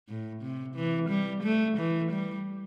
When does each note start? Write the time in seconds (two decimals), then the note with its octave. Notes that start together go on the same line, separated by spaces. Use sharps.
0.09 A2
0.42 C3
0.75 E3
1.09 G3
1.43 A3
1.78 E3
2.12 G3